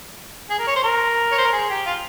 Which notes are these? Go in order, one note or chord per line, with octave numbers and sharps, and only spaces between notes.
G#4
A#4
C#5
C5
A#4
C#5
C5
A#4
G#4
G4
F4